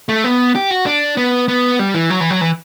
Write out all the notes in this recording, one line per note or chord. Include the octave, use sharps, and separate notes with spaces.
A3
B3
G4
F#4
D4
B3
B3
G3
E3
F#3
E3
F#3
E3